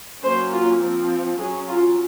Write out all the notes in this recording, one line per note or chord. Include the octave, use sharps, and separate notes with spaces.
F#3 A#3 C#4 C5
F4
F3 C4
F#3 C#4 G#4
F4